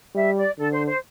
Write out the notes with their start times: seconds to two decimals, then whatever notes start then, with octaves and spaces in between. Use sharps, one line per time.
0.15 G3 E5
0.36 D5
0.58 D3 A4
0.72 C5
0.87 C5